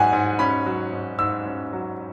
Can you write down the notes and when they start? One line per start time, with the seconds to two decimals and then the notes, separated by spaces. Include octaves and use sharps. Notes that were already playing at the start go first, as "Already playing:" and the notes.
Already playing: G#2 F#3 F#5 G#5
0.13 G#2
0.39 C#4 B5
0.66 F#3
0.93 G#2
1.19 G#2 E6
1.46 C#4
1.73 F#3